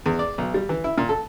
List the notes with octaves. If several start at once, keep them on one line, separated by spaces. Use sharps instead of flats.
E2
D5
B1
G3
E3
E4
A#2
A4